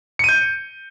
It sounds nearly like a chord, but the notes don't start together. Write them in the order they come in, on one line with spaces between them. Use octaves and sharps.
C#7 D#7 G6